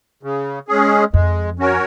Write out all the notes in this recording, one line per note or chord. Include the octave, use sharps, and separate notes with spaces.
C#3
G#3 C#4 G#4
F2 G#3
C#4 F#4 A#4 C#5